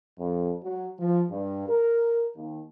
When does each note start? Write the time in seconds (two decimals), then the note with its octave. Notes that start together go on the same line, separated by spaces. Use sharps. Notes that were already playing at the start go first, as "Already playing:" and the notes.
0.19 F2
0.63 F#3
0.99 F3
1.30 G2
1.68 A#4
2.36 D#2